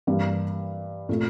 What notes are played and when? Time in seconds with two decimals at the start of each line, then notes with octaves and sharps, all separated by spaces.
0.07 G2 E3 G3 A#3
1.09 A#2 A3